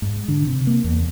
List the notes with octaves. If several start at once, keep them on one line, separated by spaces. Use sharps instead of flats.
G#2
D3
C3
A#3
E2